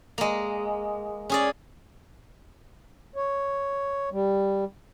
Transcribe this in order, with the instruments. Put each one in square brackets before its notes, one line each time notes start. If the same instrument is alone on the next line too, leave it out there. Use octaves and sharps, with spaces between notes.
[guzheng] G#3 A#3
C#4 G#4 D5
[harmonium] C#5
G3